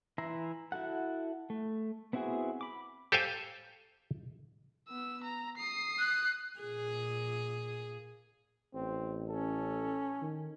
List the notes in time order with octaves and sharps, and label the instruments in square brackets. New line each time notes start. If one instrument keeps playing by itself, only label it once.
[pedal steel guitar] E3 E4 A#5 C6
E4 F#4 A4 F#5
A3
B3 C4 E4 F#4 G#4
B5 D6
[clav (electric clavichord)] G4 A4 C5 F5 G5 G#5
[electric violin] B3 E6
A#5
D#6 C7
[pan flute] F#6
[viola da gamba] A#2 G#4
[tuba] A1 [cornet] C4
[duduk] C#4 [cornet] A4
[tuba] D#3